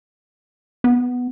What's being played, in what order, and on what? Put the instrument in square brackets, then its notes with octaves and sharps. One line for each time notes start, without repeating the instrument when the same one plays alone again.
[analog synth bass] B3